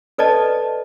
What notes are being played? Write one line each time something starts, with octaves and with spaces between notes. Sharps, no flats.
A4 B4 D5 D#5 A5